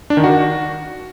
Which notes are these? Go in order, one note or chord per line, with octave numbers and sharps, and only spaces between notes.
D4
D#3
F#4